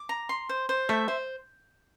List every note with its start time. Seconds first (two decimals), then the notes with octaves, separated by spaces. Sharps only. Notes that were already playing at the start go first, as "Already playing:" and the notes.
Already playing: D6
0.09 A#5
0.29 C6
0.49 C5
0.69 C5
0.89 A3 E5
1.08 C5